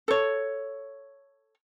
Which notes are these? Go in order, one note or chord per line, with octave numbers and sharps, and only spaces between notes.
A4 C#5